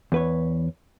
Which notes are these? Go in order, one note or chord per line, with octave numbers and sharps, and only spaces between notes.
E2 B4 C#5